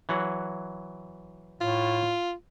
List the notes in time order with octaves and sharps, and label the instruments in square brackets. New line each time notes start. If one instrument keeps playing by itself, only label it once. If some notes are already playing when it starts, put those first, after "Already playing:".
[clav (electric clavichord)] E3 F#3 F#5
[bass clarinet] A2 [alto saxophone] F4